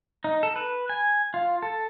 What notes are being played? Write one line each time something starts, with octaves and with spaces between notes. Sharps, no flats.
D#4
A4
B4
G#5
F4
A4